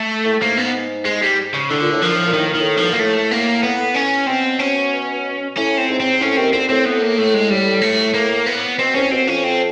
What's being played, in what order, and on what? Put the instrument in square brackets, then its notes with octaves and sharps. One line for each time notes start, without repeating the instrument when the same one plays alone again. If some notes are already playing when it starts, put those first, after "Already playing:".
Already playing: [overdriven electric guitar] A3
[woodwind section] A2
[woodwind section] G#2 [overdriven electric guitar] A#3
[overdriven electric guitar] B3
G#3
G3
C#3
[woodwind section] A2 [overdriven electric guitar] D3
[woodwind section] A#2
A2
[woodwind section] A#2 [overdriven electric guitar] F3
[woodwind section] A2
A#2
[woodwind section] A2 [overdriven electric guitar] D#3
[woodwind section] A#2
[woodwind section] A2 [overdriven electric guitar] D#3
[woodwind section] C3 [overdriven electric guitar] F3
[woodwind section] B2
[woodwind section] A#2 [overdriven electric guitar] A#3
[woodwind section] A2 [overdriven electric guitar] A3
[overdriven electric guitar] A#3
B3
C#4
[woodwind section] B2 [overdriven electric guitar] C4
[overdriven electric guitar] C#4
[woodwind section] A2 [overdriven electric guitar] C#4
[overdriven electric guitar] C4
[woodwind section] G#2
[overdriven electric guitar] C4
[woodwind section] A2 [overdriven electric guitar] C#4
[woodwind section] D#2 D#3 [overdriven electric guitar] C4
[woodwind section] D2 D3 [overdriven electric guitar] C4
[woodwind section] A2 [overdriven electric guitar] C4
[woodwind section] A2 [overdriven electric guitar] B3
[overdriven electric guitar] A#3
[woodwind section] A2 [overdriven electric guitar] A3
[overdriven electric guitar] G#3
[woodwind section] A2 [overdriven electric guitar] G3
[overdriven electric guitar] A3
A#3
B3
[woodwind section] B2 [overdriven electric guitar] C4
[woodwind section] C2 C3 [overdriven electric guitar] C#4
[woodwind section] B2 [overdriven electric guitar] C4
[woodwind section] F2 F3 [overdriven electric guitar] C#4
[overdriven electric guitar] C4